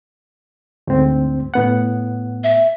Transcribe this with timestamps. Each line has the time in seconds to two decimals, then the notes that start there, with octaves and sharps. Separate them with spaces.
0.87 D2 G#2 C4
1.54 A2 B3 F#5
2.44 E5